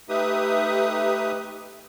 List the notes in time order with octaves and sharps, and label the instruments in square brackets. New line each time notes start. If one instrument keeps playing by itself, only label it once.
[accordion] A3 D#4 G4 B4 E5 D#6